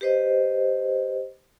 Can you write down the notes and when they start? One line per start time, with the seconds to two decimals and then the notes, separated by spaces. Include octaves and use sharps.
0.01 G4 B4 C5 D#5